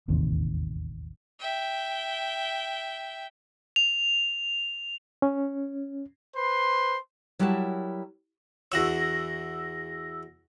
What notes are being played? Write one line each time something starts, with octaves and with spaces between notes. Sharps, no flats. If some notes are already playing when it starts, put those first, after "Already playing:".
E1 A1 D#2 C3
E5 G5
F7
C#4
B4 C5 C6
F#3 G3 E4 F#4 A#4 A5
E2 F#4 C#5 E6 A#6